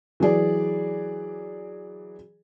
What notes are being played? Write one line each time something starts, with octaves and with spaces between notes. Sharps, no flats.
E3 F#3 G#4 D5